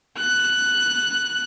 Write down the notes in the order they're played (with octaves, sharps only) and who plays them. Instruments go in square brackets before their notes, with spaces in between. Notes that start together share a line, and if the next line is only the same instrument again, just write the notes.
[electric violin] F#6